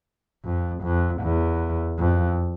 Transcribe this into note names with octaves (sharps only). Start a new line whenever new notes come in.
F2
F2
E2
F2